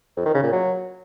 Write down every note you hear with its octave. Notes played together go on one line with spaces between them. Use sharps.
F2
D#3
C#3
A#2
F#3